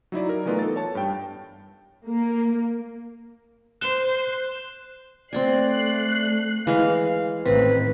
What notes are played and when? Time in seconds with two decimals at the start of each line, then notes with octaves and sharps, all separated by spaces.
0.12 F#3 D#4 E4 D5
0.29 A#4
0.46 E3 A3 B3 D#4 F4 A#4
0.59 A4 A6
0.76 C#5 A5
0.95 G2 G5
2.08 A#3
3.81 C5 F#6 E7 G7
5.33 A3 C4 D5 G5 G#5 F#6 C7
6.67 E3 G#3 F5
7.05 F5
7.45 A1 A2 D#3 C4 B4